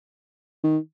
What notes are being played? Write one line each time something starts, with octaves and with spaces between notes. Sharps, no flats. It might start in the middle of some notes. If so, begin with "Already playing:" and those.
D#3